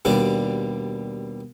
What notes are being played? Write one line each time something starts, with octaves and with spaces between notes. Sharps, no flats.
D#2 B2 G3 D4